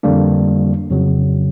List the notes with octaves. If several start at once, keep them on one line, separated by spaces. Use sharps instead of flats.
F2 D3 G3 A#3 D4
F2 C#3 F#3